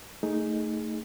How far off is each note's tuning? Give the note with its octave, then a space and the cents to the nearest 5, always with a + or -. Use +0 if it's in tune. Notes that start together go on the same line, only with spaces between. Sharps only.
A3 +20 D#4 +0 G#4 +0